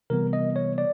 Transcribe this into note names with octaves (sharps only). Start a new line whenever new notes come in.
C3 E3 G3 B3 A#4
D#5
C#5
D5